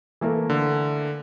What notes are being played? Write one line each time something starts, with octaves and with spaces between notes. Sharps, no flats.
E3 A3 A#3
D3